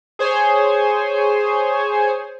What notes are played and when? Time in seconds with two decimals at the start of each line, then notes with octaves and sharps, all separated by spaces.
0.19 G#4 C5 C#5 G#5